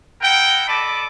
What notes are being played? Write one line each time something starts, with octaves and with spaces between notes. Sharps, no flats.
E4 A#4 F#5 G5
A4 D5 D#5 A5 B5 D6